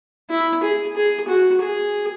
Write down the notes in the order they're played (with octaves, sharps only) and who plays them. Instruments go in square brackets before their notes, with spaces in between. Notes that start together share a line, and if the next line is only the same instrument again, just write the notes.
[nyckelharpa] E4
G#4
G#4
F#4
G#4